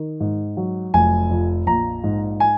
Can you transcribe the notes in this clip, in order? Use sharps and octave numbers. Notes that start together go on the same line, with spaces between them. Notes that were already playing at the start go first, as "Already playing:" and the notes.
Already playing: D#3
G#2
F#3
F1 G#5
F2
A#1 A#5
G#2
G#5